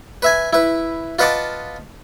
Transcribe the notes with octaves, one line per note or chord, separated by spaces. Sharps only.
B4 E5 G#5
E4 B4
F4 B4 D#5 F#5 A5 D6